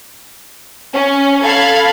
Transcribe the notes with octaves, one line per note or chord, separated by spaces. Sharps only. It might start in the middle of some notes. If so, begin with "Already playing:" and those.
C#4
A4 F5 A5 B5 G#6